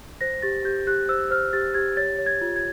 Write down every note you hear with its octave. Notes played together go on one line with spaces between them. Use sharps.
C5 A#6
G4 A6
G4 G6
G4 F#6
C5 E6
C5 F6
G4 A6
G4 G#6
C#5 A6
C#5
G#6
F4
G#6